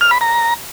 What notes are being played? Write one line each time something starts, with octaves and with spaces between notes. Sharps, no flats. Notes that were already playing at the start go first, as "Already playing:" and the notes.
F6
B5
A#5